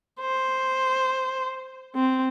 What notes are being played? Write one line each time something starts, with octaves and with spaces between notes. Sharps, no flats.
C5
C4